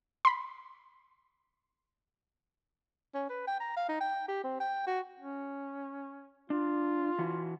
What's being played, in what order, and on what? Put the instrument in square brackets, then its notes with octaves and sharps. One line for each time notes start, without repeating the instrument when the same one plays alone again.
[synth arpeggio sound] B5 C6
[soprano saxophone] C#4
B4
G5
A#5
F5
D#4
G5
G4
C4
G5
F#4
[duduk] C#4
[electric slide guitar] D4 [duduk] F4
[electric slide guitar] E3 F#4